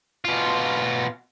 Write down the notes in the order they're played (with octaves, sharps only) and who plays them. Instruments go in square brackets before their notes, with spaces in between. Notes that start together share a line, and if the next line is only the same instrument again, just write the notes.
[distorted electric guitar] B2 F4